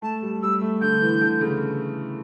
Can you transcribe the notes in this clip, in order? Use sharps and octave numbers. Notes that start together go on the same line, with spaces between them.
A3 A5
G3
G3 E6
A3
D3 G6
E3
D3
C#3